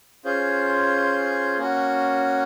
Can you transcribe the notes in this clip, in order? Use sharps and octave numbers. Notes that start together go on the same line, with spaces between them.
C#4 F4 G#4 C5
A#3 C#4 F#4